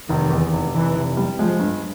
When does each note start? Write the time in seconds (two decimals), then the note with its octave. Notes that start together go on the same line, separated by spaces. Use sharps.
0.09 F1 D#3
0.30 E2
0.53 F1
0.74 F1 E3
0.96 F1
1.17 G3
1.39 F3 G#3
1.60 G2